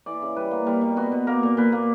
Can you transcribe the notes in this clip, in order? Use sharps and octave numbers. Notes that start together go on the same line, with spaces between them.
E3 D5
C#3
G3 B4
A#3
G3 A#4
B2
B3 F#4
B2
A#3 A#4
A#2
A#2 B4
A#3